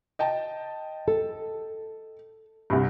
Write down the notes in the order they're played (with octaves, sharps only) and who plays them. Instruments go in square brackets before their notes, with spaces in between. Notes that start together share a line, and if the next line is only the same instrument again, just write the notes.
[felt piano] D#5 G5 A5
[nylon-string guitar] A4
[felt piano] C2 G2